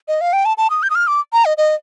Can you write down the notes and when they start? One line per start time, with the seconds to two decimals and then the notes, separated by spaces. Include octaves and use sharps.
0.08 D#5
0.21 F5
0.33 G5
0.45 A5
0.57 A5
0.70 D#6
0.83 G6
0.90 D#6
0.95 F6
1.07 D6
1.33 A#5
1.45 D#5
1.57 D#5